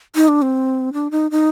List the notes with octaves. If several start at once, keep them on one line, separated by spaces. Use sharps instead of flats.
D#4
D4
C4
D4
D#4
D#4